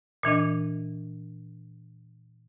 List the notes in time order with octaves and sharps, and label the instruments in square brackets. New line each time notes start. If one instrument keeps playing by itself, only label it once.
[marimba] A#2 E3 D4 D#5